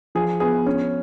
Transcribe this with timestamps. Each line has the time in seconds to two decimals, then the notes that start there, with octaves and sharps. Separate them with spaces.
0.15 F3 G#4
0.40 B3 G#4
0.66 C#4